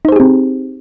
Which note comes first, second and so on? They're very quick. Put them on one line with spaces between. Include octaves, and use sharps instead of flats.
D#4 C5 G#4 G4 C4